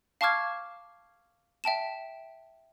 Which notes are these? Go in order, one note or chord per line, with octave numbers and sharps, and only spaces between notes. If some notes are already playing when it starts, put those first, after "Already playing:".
F5 A5 C#6 D6 F6 G#6
E5 G5 A5 E7